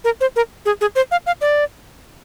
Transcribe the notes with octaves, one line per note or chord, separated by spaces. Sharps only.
A#4
C5
A#4
G#4
G#4
C5
F5
F5
D5